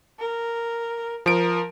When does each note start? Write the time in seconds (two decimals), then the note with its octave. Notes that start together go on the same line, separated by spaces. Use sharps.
0.19 A#4
1.26 F3 A#4 D7